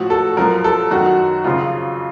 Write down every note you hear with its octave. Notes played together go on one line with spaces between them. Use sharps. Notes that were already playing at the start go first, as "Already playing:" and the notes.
Already playing: A2 F3 F#4
A4
F#2 F3 A#4
A4
F#2 D#3 F#4
F2 C#3 F3 F4